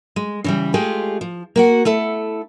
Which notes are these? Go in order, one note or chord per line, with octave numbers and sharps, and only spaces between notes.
G#3
C#3 E3 G3
G#3 A3 F4 G4 G#4
F3
A#3 F#4 F#5
A3 E4 A4